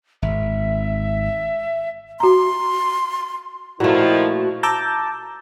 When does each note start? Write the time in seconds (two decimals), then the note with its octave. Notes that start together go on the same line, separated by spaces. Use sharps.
0.22 G#1 E5
2.20 F#4 A#5 C6
3.80 A#2 D#3 F3 A3 E4 F#4
4.63 A5 A#5 D6 E6 G6 A6